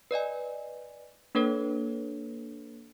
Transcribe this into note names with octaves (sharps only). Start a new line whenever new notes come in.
B4 D5 D#5 G#5
A#3 D4 A4 B4 C#5